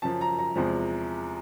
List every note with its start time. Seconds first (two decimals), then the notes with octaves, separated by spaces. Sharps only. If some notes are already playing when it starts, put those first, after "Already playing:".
0.02 F#2 C#3 F3 A5
0.21 A#5
0.39 A#5
0.56 E2 C3 F3 G#3